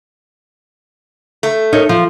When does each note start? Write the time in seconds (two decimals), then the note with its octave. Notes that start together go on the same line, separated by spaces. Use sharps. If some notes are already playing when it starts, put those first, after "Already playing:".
1.43 A3
1.73 D#4 A#4 C#5
1.89 F3